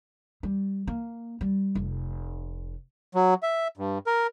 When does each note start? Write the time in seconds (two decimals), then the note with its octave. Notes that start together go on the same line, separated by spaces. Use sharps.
0.43 G3
0.87 A#3
1.41 G3
1.75 F1
3.15 F#3
3.43 E5
3.77 G2
4.07 A#4